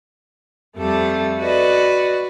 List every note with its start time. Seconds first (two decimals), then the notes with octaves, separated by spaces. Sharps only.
0.78 F2 G3 A3 A4
1.39 F#4 B4 D5 D#5